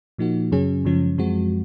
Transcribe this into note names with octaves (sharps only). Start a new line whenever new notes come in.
A#2 F3 A#3 D#4 F#4
F#2 C#3 F#3 C#4 G#4
F#2 C#3 F3 G#3 C#4
F#2 F3 G#3 C4 F#4